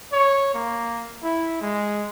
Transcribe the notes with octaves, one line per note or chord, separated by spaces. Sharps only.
C#5
A#3
E4
G#3